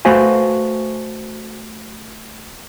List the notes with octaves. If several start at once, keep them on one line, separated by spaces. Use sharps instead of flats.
A3 F#4 B4 C5 F5 G#5